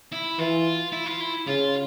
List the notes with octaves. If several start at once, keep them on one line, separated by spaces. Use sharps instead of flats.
E4
E3 F4
E4
F4
E4
C#3 F4